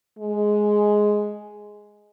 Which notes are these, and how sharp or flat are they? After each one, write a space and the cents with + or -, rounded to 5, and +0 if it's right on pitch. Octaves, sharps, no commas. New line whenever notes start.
G#3 +5